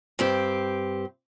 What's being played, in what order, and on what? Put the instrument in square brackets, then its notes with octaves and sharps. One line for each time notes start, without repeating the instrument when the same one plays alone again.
[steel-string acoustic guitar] G2 C4 G4